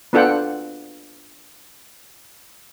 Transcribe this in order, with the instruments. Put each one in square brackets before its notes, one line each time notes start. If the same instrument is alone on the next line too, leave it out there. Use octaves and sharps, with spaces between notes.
[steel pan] B3 D4 F4 A4 F#5 G5